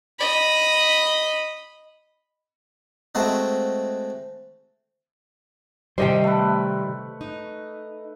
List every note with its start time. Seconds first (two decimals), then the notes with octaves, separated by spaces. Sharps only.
0.19 D#5 B5
3.15 G#3 A3 C4 F#4 D#5
5.98 C3 D#3 G3 C5 D#5 G5
6.24 A3 B4
7.21 D#4